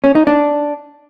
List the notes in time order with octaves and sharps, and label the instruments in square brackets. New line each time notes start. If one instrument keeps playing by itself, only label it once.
[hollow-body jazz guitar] C#4
D#4
D4